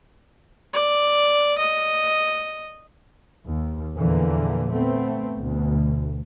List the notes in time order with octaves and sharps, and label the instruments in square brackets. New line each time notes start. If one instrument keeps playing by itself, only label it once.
[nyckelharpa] D5
D#5
[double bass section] D#2
E2 A#2 D3 E3 F3 A#3
A3 B3 C4
D2 B2